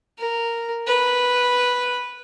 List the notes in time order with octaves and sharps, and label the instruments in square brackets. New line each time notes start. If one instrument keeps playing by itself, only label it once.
[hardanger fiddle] A#4
B4